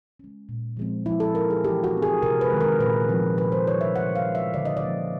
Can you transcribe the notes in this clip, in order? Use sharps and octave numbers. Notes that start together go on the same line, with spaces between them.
G#3 C#4
A#2
F3 G#3 C4
F3 E4
A4
A#3 D#4 A#4
G#4
E3 G4
F#4
A3 C4
G#4
C3 A#4
B4
D#3 G#3
A#4
A#2 B4
F3 A3 C4 D#4
A#2 B4
C5
G3 C4 D#4 C#5
E5
C#3 F#5
F5
E3 G#3 C#4
E5
D3 D5
D#5
D5
F3 A#3 C#4